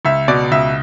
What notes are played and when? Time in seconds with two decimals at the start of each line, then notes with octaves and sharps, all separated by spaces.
0.05 C#2 E5
0.28 B2 D5
0.51 C#2 E5